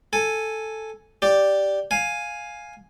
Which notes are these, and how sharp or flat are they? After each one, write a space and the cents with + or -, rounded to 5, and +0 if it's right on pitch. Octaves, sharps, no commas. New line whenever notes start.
A4 +0 G#5 +0
G4 +0 D5 +0
F5 +10 G#5 +0